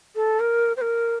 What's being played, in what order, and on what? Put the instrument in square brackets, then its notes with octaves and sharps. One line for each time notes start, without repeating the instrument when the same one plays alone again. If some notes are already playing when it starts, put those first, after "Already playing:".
[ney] A4
A#4
C5
A#4